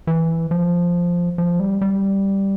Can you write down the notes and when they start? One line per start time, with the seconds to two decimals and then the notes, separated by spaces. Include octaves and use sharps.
0.07 E3
0.51 F3
1.38 F3
1.60 G3
1.81 G3